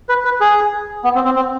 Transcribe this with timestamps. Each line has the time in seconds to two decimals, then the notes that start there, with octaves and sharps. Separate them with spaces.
0.09 B4
0.25 B4
0.40 G#4
1.04 B3
1.15 C4
1.25 C4
1.36 C4